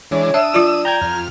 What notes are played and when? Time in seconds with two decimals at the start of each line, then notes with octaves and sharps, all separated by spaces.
0.11 E3 G#3 D4 C#5
0.34 D4 E5 D#6 E6
0.54 F#3 F4 D5
0.85 G5 A#5 G6 G#6
1.01 F2 F6